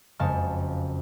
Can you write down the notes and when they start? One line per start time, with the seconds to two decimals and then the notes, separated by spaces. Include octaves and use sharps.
0.19 F#1 F2 G#3 A5 C#6 F6